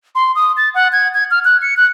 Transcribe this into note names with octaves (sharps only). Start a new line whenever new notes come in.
C6
D#6
A6
F#5
G#6
G#6
F6
F#6
C#7
F#6